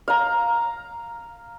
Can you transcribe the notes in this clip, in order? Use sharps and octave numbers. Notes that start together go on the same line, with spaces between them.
F5 A#5